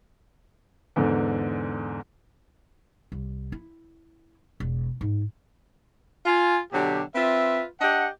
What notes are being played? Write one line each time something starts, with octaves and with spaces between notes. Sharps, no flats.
E2 G#2 D3
C2
E4
E1
G#2
F4 G#5
B2 D3 F#3 G4
C4 F4 B4 E5
D4 G4 D#5 F#5